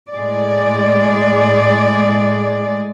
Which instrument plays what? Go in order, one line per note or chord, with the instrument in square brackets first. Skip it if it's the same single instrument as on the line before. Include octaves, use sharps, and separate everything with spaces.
[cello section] A2 G#3 G#4 D5